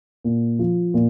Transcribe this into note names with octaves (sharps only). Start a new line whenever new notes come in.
A#2
F3
A#2